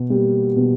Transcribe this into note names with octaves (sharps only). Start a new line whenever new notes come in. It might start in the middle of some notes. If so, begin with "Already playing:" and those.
Already playing: B2
G3 A#3
B2